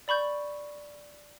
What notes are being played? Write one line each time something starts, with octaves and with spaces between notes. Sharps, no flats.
D5 B5 C#6 G6